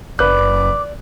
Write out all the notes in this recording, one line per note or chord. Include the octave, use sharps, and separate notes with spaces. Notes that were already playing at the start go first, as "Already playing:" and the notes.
F#1 B4 D5 D6 F#6